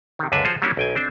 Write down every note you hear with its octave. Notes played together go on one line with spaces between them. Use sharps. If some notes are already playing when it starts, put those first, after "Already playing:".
C3 D#3
C#2 F#2 D3 D4 B4 E5
F3 F4 F#4 G#4 C5
F#3 G3 A#3 C#4 D4 E4
B1 G5 G#5
C4 D4 C5